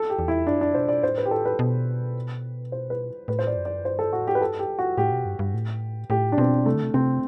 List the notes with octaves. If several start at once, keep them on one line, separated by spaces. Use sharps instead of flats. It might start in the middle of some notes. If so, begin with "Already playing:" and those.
Already playing: A4
G4
E2
E4
F#2 D4
D4
B2 C5
D5
A2 C5
B4
G4
A4
B4
B2
C5
B4
A2 B4
C5
D5
F#2
D5
G2 C5
A4
A2 F#4
G4
B4
G2 A4
G4
F#4
A2 G4
B2
G2
G2
A2
A2 G4
D4
B2 C4
C3 A3
D3
C3
C3 C4